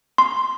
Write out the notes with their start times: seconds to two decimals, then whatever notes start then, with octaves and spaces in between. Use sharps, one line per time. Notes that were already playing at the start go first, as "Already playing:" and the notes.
0.18 C6